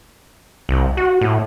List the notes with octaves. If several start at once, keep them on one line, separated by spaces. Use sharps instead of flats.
C2
F#4
A2